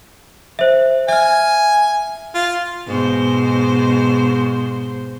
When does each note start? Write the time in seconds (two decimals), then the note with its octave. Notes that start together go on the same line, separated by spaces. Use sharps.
0.59 C5 E5
1.09 E5 G#5 F6
2.35 F4
2.87 G#2 B2 C5